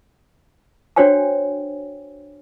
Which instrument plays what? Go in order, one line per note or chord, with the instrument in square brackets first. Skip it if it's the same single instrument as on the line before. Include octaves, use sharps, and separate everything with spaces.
[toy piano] D4 F#4 C5 C#5 G5 G#5